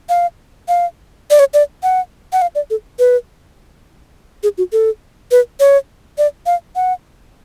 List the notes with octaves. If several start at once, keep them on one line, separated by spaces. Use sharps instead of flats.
F5
F5
D5
C#5
D5
F#5
F#5
F5
D5
A4
B4
G#4
F#4
A4
B4
C#5
D5
F5
F#5